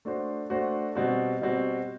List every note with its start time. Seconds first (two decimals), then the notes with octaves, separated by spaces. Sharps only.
0.05 A3 D4 F#4 C5
0.50 A3 D4 F#4 C5
0.95 B2 G3 C4 F#4
1.42 B2 G3 C4 F#4